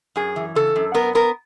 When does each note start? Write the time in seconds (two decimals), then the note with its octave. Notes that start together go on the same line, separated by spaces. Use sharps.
0.16 F#2 G#4
0.36 E3
0.55 C#3 A4
0.76 F#2
0.94 B3 A#4
1.15 B3 A#4